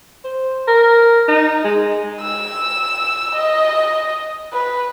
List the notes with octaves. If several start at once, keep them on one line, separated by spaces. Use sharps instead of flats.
C5
A#4
D#4
G#3
E6
D#5
B4